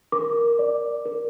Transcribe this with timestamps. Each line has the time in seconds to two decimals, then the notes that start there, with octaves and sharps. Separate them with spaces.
0.12 A#4 D6
0.59 D5
1.06 A#4